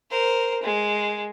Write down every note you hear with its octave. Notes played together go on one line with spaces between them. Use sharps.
A#4 C5
G#3